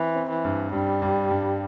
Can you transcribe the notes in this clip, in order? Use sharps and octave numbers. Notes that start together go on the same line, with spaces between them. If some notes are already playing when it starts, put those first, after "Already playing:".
Already playing: E3 C4
C4
E3
G2
G2 G3
G2
G2